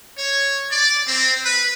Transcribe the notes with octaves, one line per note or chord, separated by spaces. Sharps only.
C#5
D5
C4
B4